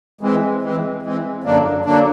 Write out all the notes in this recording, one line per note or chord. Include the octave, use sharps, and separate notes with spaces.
E3 G#3 C4
E3 G#3 C4
E3 G#3 C4
F#2 D3 F#3 A#3 D4
D3 F#3 A#3 D4